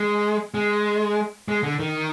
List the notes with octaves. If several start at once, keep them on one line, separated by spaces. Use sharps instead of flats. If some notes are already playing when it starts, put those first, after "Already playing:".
Already playing: G#3
G#3
G#3
D3
D#3